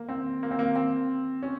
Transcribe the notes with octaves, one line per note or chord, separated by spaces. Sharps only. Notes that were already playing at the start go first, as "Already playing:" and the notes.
Already playing: A#3
C4
A#3
C4
A#3
C4
C#4